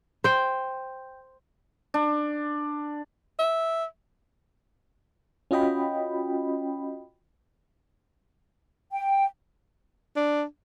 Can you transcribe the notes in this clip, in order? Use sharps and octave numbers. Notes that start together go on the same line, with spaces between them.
C5 G5
D4
E5
C#4 F4 F#4 D#5 G5 B5
G5
D4